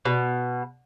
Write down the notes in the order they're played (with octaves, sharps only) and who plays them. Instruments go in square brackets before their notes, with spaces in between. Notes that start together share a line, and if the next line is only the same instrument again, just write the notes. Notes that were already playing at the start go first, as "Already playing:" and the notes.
[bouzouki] B2